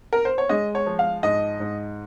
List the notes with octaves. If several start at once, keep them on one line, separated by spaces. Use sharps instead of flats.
A#4
C5
C#5
G#3 D#5
C#5
F3
F5
G#2 D#5
G#2